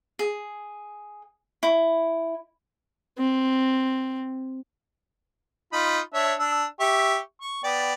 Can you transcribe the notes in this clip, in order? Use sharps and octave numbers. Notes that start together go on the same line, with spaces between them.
G#4
E4
C4
D#4 F4 B5
D4 C#5 E5
D4 E6
G4 E5 C#6
C#6
B3 D5 G5